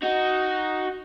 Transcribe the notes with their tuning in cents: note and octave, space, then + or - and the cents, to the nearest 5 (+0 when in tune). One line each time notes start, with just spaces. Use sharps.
D#4 +0 F#4 +5